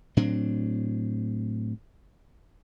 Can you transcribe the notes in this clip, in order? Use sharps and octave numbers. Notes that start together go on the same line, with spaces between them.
A2 F#3 C4 D4